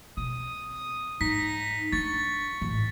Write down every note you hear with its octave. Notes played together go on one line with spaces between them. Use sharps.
B2 D#6
G#2 D#4 B6
D4 C#6 A6
A1 G#2